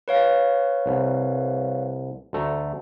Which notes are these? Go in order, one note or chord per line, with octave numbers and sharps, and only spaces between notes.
B4 C#5 F5
C2
D2 A3 A#5